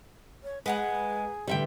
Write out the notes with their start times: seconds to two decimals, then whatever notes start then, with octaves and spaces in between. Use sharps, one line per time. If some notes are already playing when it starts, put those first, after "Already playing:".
0.43 C#5
0.66 G#3 G#4 B4 F#5 A#5
1.48 A1 D3 G3 E5 G5